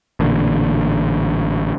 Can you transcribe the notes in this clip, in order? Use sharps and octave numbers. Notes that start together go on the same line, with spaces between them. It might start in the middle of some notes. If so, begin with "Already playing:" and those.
A1 A#2 D3